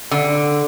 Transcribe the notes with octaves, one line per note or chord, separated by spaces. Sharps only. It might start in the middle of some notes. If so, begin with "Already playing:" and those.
D3